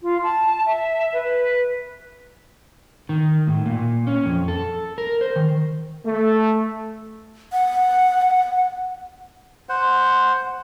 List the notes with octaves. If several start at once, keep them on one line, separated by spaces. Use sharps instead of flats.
F4
A5
E5
B4
D#3
A2
A#2
C#4
F2
A4
A#4
C5
D#3
A3
F#5
C5 F#5